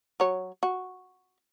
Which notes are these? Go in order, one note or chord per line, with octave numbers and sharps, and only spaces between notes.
F#3 C#5
F#4